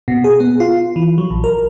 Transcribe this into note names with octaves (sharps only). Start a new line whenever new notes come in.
B2
G#4
B3
F4
E3
F#3
A#1
A#4